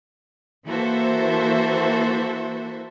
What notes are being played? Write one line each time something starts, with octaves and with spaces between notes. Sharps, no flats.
E3 A#3 F#4 A4 C5 E5